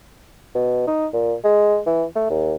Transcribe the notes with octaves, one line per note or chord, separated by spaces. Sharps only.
B2
D#4
A#2
G#3
E3
A3
D#2